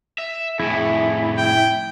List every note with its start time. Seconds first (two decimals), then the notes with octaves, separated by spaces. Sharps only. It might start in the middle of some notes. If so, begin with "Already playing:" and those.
0.18 E5
0.60 F2 A2 E4 G#4
1.38 G5